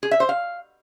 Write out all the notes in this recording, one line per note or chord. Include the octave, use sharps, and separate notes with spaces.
G#4
E5
C5
F5